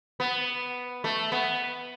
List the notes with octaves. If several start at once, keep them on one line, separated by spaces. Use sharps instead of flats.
B3
A3
B3